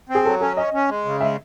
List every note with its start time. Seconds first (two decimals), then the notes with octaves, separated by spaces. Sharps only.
0.09 C4
0.15 G#4
0.25 F#3 A4
0.41 C#4 A4
0.57 C#4 D#5
0.74 C#4
0.89 G#3
1.05 C#3
1.21 G#3 E5